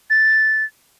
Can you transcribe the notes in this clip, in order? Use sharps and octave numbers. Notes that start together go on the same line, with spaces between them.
A6